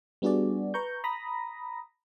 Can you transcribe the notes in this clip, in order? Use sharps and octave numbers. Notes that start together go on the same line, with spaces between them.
G3 B3 D4 F#4 G#4 D5
B4 A#5 C#6 G6
A#5 B5 D#6 A#6